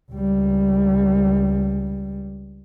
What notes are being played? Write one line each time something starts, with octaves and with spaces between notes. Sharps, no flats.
C#2 G3